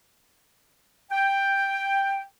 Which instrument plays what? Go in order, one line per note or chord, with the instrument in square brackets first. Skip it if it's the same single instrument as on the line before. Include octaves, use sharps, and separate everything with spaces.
[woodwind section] G5